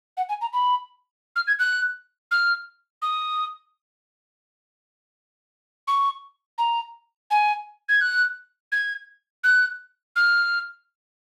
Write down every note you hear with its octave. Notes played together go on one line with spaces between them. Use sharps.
F#5
G#5
A#5
B5
F6
G#6
F#6
F6
D#6
C#6
A#5
G#5
G#6
F#6
G#6
F#6
F6